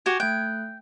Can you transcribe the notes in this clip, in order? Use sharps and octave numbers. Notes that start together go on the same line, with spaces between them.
F#4 G4 G#5 G#6
A3 G5 F#6